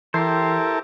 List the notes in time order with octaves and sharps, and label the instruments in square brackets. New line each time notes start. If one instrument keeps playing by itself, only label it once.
[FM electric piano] E3 C7 [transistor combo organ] E4 A4 A#4 [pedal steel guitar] G4 C5